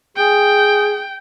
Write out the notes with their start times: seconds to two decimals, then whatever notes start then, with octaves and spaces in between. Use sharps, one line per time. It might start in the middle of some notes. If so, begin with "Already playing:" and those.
0.17 G#4 G5